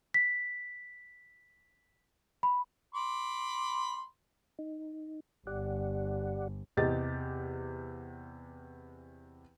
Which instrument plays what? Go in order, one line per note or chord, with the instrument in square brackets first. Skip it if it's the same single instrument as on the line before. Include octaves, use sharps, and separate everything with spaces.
[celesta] B6
B5
[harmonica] B5 C6 D6
[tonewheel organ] D#4
[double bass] G1 [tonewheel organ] G4 D5 F#5
[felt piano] E2 C3 G4 D#5 A6